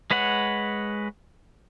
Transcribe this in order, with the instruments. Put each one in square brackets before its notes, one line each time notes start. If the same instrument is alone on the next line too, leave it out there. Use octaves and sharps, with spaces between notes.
[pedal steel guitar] G#3 B4 C#5 F#5